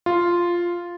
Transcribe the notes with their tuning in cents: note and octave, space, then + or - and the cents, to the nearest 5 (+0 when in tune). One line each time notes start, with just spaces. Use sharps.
F4 -5